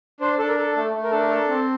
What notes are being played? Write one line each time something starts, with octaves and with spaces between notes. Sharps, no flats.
D4 C5
D4 A4
A#4
A4
A3 A4
A3
A#4
D4 A4
A#4
A4
C4